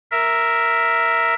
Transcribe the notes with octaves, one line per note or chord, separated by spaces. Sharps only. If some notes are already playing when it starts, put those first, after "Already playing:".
A#4 E5